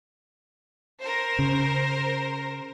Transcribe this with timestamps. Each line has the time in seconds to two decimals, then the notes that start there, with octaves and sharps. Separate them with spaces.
1.01 A#4 C5
1.39 C#3